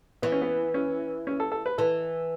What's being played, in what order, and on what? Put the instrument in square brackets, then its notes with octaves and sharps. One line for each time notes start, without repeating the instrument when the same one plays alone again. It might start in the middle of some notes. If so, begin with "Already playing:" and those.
[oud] E3 [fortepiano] B3
[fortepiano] C#4
B3
C#4
C#4
A4
A4
B4
[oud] E3 [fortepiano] A4